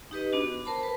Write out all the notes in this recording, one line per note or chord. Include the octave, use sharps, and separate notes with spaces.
D#4 G4 B4 D#5
B3 D4 F#4
A#4 C5 A5 B5
B4 A5